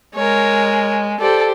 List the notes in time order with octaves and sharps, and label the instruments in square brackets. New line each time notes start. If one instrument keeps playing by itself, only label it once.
[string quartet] G#3 [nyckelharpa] A#4 C#5
[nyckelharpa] G4 C5 [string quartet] A4 D5